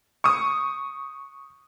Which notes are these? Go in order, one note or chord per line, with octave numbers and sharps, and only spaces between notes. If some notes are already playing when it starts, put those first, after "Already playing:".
C#6 D#6